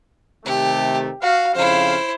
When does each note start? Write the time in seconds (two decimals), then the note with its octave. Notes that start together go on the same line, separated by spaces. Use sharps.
0.45 C3 D#3 A3 G4
1.22 F#4 F5
1.55 F2 C#3 E4 C5 F5